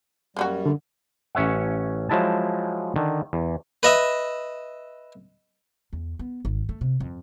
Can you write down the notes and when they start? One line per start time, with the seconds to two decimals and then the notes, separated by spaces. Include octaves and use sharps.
0.36 F#2 G3 A#3 C#4 F#4
0.66 D3
1.35 A1 C#4 C#5 E5 F#5
2.09 F3 F#3 G#3 E4 G#4 A5
2.96 D3 D#3
3.33 E2
3.83 B4 D#5 E5
5.93 E2
6.19 B3
6.45 G#1
6.69 A3
6.81 C3
7.00 F2